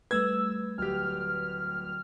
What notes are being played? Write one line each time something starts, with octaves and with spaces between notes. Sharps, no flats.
G3 A3 B4 E6 G#6
D1 G4 F6